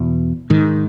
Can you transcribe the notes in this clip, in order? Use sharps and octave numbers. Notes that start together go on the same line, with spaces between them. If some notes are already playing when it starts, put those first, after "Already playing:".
Already playing: E2 B2
G#2 D#3